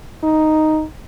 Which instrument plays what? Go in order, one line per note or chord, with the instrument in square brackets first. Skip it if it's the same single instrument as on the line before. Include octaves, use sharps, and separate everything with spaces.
[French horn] D#4